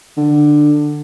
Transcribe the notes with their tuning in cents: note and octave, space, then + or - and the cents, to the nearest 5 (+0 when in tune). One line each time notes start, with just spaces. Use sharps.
D3 +15